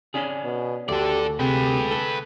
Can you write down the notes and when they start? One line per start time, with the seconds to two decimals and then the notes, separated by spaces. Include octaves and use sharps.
0.14 C#4 D4 G#4
0.44 B2
0.88 D2 G4 A4 D5
1.39 C3 G#4 B4 G5
1.91 A4